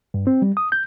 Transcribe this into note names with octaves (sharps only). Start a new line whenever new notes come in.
G2
C4
G3
D#6
G6